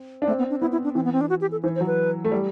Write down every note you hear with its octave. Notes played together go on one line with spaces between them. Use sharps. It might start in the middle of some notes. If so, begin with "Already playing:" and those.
Already playing: C4
D4
A3 C4
B3
D4
B3 E4
E4
D4
E3 C4
B3
C4
D4
F#4
G4
A4
E3 C5
C5
F#3
B4
A3
G3